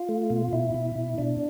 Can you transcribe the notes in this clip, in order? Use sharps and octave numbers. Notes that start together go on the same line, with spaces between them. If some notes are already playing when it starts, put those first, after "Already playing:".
Already playing: F4
A3
B2
B2 E4
B2
B2
B2 D4